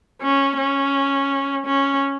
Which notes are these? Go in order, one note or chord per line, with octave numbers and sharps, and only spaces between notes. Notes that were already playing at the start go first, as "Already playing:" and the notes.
C#4
C#4
C#4